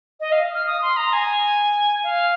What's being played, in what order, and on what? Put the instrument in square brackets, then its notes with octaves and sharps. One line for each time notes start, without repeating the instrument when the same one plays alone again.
[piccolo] D#5
F5
F6
D#6
C6
A#5
G#5
F5